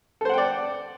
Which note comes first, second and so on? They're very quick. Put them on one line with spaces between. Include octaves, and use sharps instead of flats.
A4 C5 F#5 G5 D5